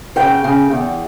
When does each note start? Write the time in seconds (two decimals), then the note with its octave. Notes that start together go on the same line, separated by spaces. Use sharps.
0.16 C#3 G5
0.44 C#3
0.71 E2